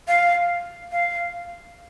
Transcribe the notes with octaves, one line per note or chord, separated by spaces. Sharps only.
F5
F5